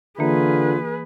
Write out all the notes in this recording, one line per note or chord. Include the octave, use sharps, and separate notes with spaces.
D3 E3 A#3 F4 G#4 B4